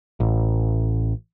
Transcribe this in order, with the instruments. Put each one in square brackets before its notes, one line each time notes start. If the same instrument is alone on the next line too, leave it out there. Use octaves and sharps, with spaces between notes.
[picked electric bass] A1